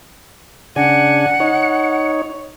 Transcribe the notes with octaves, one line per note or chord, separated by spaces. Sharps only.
C#3 D4 F#5 G#5
D#4 C#5